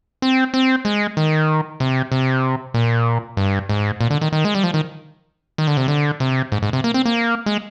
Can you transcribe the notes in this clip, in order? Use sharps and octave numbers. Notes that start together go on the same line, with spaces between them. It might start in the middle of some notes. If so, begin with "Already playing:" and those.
C4
C4
G#3
D#3
C3
C3
A#2
G2
G#2
A#2
D3
D#3
D#3
G#3
G3
F3
D#3
D#3
D3
C3
D3
C3
G#2
G#2
C3
A#3
C4
A#3
G#3